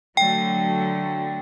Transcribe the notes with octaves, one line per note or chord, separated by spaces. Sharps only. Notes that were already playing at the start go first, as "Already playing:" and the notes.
D3 F#3 A3 G5